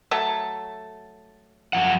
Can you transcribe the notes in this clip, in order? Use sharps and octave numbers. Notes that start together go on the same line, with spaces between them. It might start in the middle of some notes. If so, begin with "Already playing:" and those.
F#3 A3 A4
F#2 F3 F#5